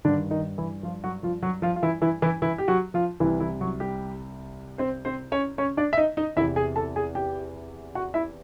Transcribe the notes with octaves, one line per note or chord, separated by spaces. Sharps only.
G2 D3 D#3 D4
D#3 D#4
E3 E4
F3 F4
F#3 F#4
F3 F4
F#3 F#4
F3 F4
F4
E3 E4
E3 E4
E3 E4
E3 E4
G4
F#3 F#4
F3 F4
C2 C3 E3 E4
E3 E4
F#3 F#4
G3 G4
C4 C5
C4 C5
C#4 C#5
C#4 C#5
D4 D5
E5
D#4 D#5
D#4 D#5
E2 C3 E3 E4 E5
G#4 G#5
A4 A5
G#4 G#5
G4 G5
F#4 F#5
E4 E5